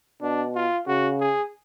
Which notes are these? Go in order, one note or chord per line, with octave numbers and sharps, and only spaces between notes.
B2 D4
F4
C#3 F#4
G#4